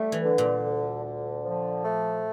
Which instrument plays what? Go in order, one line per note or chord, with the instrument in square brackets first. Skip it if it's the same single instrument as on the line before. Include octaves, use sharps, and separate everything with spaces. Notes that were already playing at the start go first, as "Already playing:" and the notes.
Already playing: [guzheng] G3 [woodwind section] A3
[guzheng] E3
[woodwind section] D3
[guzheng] A#2
[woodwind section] D2
D3
F3
A3